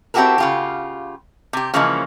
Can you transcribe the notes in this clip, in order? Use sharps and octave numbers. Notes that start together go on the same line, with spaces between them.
C4 E4 F#4 G4 A4 A#4
C#3 F4 G4
C3 G4
C#3 E3 F3 G#3 A#3 C#4